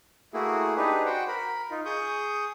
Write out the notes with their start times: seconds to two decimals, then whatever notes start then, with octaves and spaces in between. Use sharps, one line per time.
0.34 A3 A#3 E4 F#4 G#4
0.76 D4 D#4 G4 G#4 B4
1.06 F#4 C5 F#5 G5
1.28 A#4 B5
1.71 D#4 F4
1.85 G#4 C#6 D#6 G6